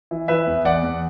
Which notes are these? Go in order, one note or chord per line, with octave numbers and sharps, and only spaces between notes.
E3
E3 B4 E5
E2
E2 D5 F#5
E2